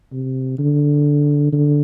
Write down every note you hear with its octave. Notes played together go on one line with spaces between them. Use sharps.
C3
D3
D3